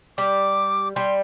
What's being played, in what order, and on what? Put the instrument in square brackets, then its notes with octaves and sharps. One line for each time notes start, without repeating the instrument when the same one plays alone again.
[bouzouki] G3 [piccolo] D6
[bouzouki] G3 [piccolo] C6